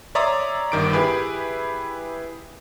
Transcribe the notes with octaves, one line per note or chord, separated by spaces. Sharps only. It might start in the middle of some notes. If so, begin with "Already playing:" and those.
C#5 D5 E5 A#5 C6 D#6
G1 G2 D#3 D6 D7
E4 G4 G#4 B4